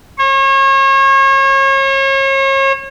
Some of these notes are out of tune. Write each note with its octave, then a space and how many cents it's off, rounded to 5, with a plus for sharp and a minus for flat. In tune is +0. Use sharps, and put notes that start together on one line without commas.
C#5 -35